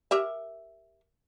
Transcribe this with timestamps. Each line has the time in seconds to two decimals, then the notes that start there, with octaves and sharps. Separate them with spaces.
0.11 G4 A#4 E5